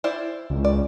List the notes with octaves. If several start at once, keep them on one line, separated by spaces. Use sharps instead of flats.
E4 C5 D5
C#2
D5